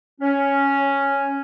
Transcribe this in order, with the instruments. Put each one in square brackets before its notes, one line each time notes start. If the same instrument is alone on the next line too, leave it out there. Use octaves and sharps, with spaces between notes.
[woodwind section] C#4